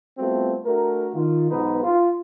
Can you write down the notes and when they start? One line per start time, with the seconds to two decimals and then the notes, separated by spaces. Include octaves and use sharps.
0.18 G3 A3 B3 C4 F4 F#4
0.65 A3 D4 F#4 A#4
1.14 D#3 F4
1.50 B1 G#2 B3 D#4 B4
1.83 F4